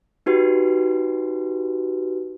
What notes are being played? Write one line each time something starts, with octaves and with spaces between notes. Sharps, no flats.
D#4 F#4 G4 B4